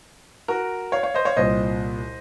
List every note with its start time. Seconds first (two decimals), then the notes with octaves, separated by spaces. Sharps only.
0.48 F#4 A#4
0.92 C#5 F5
1.03 C#5 F5
1.14 C5 D#5
1.25 C#5 F5
1.36 C2 A#2 C5 D#5